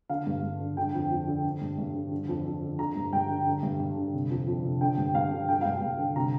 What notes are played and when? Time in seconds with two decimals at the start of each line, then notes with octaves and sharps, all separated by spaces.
0.09 D3 F5
0.27 G2
0.43 G2
0.60 D3
0.77 D3 G5
0.94 F2
1.10 F2
1.27 D3
1.44 D3
1.61 G2
1.78 G2
1.94 D3
2.11 D3
2.28 F2
2.45 F2
2.62 D3
2.79 D3 A#5
2.96 G2
3.13 G2 G5
3.29 D3
3.46 D3
3.63 G2
3.80 G2
3.97 D3
4.14 C3
4.30 F2
4.47 F2
4.64 C3
4.81 D3 G5
4.98 G2
5.15 G2 F5
5.32 D3
5.48 D3 G5
5.61 G2 F5
5.74 G5
5.82 G2
5.99 D3
6.16 C3 A#5